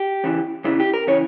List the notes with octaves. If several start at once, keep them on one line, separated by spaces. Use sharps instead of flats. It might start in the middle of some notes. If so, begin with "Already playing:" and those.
Already playing: G4
E2 C#3 E3
E2 C#3 E3
G4
A#4
C#3 E3 C#5